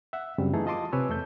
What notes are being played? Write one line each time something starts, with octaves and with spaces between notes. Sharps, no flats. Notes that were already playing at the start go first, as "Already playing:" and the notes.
E5 F#5
F#2 C#3 G3 C4
E3 A3 D#4 G#4 A4
F4 D#5 A5 C6 D6 D#6
C3 B4 C#5 G#5 E6
E2 A3 A4 G6